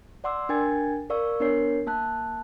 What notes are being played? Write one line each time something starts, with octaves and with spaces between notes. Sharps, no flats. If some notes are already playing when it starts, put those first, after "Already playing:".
D5 F#5 C6 D6 E6
D4 A#4 G5 G#5 G#6 A6
A#4 D5 F5 C#6 E6
B3 D4 A#4 C#5 C7
A#3 A5 F#6